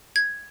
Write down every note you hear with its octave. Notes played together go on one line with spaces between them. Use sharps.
G#6